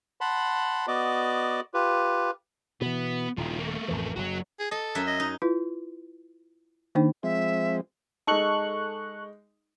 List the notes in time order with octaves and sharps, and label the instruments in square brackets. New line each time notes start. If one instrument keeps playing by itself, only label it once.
[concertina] F#5 A5 B5 C6
B3 F#4 D5 D#5 D6
F4 G4 B4
[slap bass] B2 E3 [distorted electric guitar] B3
[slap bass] D#1 [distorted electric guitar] D#3 F3
[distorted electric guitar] A3 A#3
[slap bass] A1 F2 E3
[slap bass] F#1 F#2 [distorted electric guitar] F#3 F#4
[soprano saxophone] G#4
[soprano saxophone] A4 [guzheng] D#5
[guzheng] F#2 F#3 E5
[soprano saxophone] D#5
[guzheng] D#4
[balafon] E4 F4 B4
D#3 A#3 D4 D#4 C5 G5
[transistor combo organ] F3 G#3 C4 [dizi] E5
[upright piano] G#3 D#4 [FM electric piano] A4 C#6 F#6